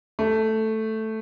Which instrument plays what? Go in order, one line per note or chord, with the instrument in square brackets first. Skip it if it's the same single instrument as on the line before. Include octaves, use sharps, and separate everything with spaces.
[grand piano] A3